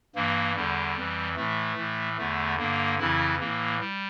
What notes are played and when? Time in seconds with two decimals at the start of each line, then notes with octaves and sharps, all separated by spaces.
0.15 G2 E3 A#3
0.55 E2 D3 G3
0.96 F2 E3
1.36 A2 E3 A3
1.77 A2 E3
2.18 E2 D3 A3
2.58 G2 D3 A#3
2.99 F2 C#3 E3 E4
3.39 E3 A#3
3.44 A2
3.80 G3